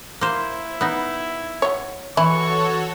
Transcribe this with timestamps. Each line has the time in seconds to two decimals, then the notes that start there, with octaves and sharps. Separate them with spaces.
0.21 A#3 E4 C5
0.81 B3 D#4
1.62 F#3 C#5
2.17 E3 E4 F#4 A4 C#5 C#6